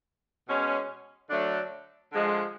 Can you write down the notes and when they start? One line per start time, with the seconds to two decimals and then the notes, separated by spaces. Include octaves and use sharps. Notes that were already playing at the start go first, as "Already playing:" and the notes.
0.49 B2 G#3 C#4
1.30 D3 F#3 A3 D4
2.13 D3 F3 G#3